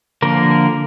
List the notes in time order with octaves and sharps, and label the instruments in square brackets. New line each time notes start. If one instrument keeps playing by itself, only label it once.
[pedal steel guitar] D3 F3 A#3 A#4